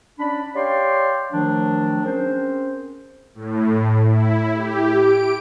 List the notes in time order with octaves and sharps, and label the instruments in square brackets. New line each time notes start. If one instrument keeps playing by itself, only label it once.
[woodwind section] C#4 D4 D5 B5
G4 C#5 D5 F5 G5 C6
D#3 F3 F#3 A3 D4
C4 C#4 G#4 A#4 C5
[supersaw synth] A2
E4
G4
D7